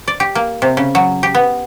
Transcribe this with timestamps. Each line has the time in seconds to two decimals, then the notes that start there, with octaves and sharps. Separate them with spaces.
0.08 D5
0.20 G4
0.35 A#3
0.62 C3
0.77 C#3
0.95 F#3
1.23 G4
1.35 B3